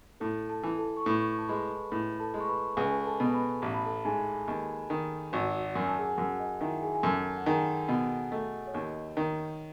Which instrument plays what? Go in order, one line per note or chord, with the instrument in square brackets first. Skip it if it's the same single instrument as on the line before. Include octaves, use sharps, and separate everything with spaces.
[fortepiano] A2 [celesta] A4 A5
[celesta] A4 A5
[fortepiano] E3
[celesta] A4 A5
C#6
[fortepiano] A2 [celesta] B4 B5
[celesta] A5
[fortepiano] G#3 [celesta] B4 B5
[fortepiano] A2 [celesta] B4 B5
[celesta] A4 A5
[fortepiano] G#3
[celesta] C#6
B4 B5
[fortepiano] C#2 [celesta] G#4 G#5
[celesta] A4 A5
[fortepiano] B2
[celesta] B4 B5
[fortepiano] A1 [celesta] A5
[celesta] B5
A4 A5
[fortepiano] G#2 [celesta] G#4 G#5
[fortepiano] D#2
D#3
[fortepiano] G#1 [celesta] F#4 F#5
[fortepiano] F#2 [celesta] G#5
[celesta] A5
G#4 G#5
[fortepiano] F#2 [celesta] F#4 F#5
[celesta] D#5
[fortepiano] D#3 [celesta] E4 E5
[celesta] G#4 G#5
G#5
[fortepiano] F#2 [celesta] A4 A5
[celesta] F#5
[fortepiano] D#3 [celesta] G#4 G#5
[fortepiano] B2 [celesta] F#4 F#5
[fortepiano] A3 [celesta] D#5
[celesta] C#5
[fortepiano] D#2 [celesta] D#5
[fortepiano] D#3